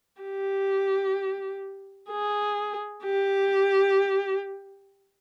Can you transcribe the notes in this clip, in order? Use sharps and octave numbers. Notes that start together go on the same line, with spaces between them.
G4
G#4
G4